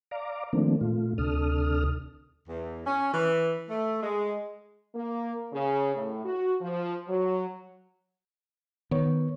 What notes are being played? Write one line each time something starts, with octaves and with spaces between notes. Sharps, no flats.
D5 F5 A#5 D6
D#3 F3 A3 A#3 C4 D4
A#2 A3 F4
D2 C3 D4 A4 D#6 F6
E2
C#4
E3
A3
G#3
A#3
C#3
A2
F#4
F3
F#3
D#3 B3 C#5